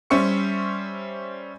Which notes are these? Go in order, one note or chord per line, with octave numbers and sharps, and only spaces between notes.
G3 C#4 C5 E5 C#6 C#7